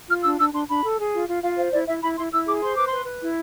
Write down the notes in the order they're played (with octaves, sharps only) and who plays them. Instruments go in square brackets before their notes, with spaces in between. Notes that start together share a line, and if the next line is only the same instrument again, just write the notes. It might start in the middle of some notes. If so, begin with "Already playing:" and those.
[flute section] F4 F6
D4 E6
D4 E6
D4 C6
D4 B5
A4
G#4
F4
F4
F4 F5
C5 F5
E4 D5
E4 E5
E4 B5
E4 C6
E4 E6
G#4 D6
C5 C6
B4 D6
B4 C6
B4
E4